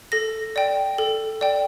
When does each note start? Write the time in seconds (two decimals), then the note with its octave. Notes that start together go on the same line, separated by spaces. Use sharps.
0.12 A4 A#6
0.56 D5 G5
0.98 A4
1.41 D5 G5